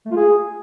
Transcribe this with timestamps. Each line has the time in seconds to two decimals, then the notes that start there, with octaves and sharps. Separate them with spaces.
0.05 A3
0.11 F4
0.17 G#4